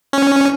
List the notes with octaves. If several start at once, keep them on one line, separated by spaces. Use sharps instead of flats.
C#4